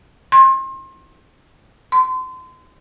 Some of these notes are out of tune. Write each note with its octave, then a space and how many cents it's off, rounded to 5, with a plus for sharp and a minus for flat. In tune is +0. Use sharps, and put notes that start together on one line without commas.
C6 +35
C6 -30